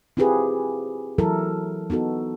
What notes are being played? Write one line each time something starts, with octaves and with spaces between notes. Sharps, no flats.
C4 E4 F4 G4 G#4 B4
E3 F#3 E4 A4 A#4
B3 D#4 F#4 A4